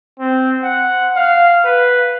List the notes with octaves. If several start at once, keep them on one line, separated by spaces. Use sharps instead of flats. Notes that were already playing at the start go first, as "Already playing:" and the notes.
C4
F#5
F5
B4